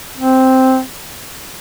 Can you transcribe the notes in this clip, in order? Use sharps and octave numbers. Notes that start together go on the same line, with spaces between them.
C4